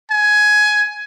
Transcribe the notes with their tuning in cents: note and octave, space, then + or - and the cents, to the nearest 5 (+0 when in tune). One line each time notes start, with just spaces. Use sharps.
G#5 +15